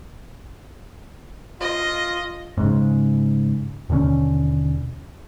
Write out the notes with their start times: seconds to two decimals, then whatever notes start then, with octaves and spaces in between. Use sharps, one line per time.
1.60 F4 D#5
2.57 G#2 C#3
3.89 D#2 B2 D3 C#4